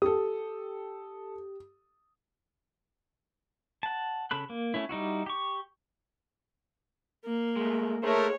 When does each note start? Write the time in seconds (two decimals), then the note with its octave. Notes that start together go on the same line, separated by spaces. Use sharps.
0.02 G4 A4 D#6
3.83 F#5 A5
4.31 C#3 A4 B5 F#6
4.50 A#3
4.74 A3 C#4 E4
4.89 G3 D#4 E4 F#4
5.26 G4 C#6
7.25 A#3
7.56 G#3 A3
8.03 A3 G#4 A#4 C5 C#5